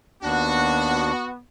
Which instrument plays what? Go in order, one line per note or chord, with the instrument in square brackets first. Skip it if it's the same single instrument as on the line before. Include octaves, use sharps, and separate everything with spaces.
[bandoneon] D#2 D4 [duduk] B3 [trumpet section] F#4